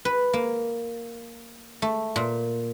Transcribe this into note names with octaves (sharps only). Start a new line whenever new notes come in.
B4
A#3
A3
A#2